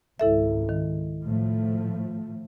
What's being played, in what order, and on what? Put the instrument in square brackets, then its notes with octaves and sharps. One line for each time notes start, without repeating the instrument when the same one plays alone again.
[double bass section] G#1 C#2 [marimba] E4 A4 E5
[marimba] D#3
[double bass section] A2 F3 A3